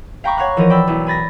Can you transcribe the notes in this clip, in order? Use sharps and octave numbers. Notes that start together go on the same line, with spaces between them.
F5 G5 A#5 B5 C#6 D6
C#5 F5 F#5 C#6 F#6
E3 F3 A#4 D#5
D5 G5 B5 E6
B1 E4
G#5 B5 A6 A#6